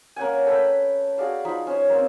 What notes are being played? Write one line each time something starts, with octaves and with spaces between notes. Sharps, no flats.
A#3 C#4 F#5 G#5
A4 B4 G5 B5
F#4 G#4 D5 F5
F3 D#4 B5
C#4 C5
A#3 C4